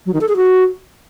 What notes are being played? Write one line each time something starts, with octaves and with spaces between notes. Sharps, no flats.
F#3
D#3
A4
G#4
F#4